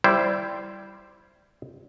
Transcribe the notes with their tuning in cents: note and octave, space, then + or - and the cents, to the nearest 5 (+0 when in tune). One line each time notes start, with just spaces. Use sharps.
G3 +0 E4 +20 C5 +0